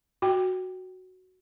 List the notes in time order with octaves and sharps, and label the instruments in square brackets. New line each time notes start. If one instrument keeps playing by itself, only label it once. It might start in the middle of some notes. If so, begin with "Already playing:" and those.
[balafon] F#4 G5